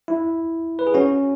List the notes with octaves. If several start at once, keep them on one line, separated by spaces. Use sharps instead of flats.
E4
B4
G#4
C#4 F#4